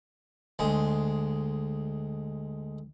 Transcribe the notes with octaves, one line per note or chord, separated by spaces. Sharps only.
D2 G#3 C6